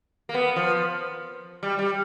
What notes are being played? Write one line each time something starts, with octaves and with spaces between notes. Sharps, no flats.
A#3
B3
F3
G3
G3